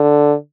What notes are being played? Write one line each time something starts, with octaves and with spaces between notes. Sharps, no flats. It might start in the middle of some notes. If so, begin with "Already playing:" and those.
Already playing: D3